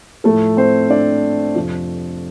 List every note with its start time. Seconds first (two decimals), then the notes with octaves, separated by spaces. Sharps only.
0.24 A2 F3 A3 A4
0.57 C4 C5
0.90 D4 D5
1.55 F2 C3 F3